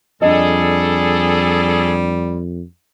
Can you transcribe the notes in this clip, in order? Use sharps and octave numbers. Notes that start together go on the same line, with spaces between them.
F2 G3 D4 G#4 A4 D#5